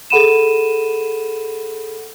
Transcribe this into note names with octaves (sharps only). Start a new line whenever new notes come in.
G#4 A4 F#5 B5 D#7 E7